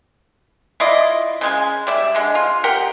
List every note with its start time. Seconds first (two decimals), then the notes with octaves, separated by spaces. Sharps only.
0.80 E4 F4 D5 D#5
1.41 C#3 G#3 G#5
1.87 G3 D5 E5
2.15 D3 G#3
2.35 F4
2.64 G4 A#4 F#5 G5